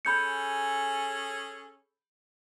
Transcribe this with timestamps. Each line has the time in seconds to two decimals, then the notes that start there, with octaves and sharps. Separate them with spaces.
0.05 C#4 G#4 A4 B5 G6 C#7